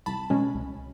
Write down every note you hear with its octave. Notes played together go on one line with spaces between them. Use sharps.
C2 A5 B5
B2 G#3 C#4
C2